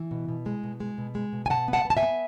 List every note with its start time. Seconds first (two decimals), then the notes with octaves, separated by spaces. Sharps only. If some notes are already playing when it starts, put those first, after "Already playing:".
Already playing: E3
0.11 B2
0.29 B2
0.46 G#3
0.64 B2
0.80 G#3
0.98 B2
1.15 G#3
1.33 B2
1.46 G#5
1.50 B2 F#5 A5
1.68 B3
1.73 F#5 A5
1.85 B3
1.90 A5
1.97 E5 G#5
2.03 B3